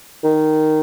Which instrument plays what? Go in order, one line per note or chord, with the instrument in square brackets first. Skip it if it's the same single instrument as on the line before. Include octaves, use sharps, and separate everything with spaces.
[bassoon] D#3